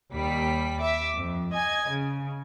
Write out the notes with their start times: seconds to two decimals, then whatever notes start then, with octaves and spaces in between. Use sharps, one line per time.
0.13 D#2 G3 B6
0.81 E5 D6
1.15 F2
1.54 D#5 G#5 G#6
1.89 C#3